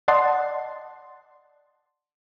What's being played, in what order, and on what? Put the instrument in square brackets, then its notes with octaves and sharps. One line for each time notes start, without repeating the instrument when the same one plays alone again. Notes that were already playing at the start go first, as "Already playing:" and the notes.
[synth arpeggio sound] D5 D#5 F#5 A5 C6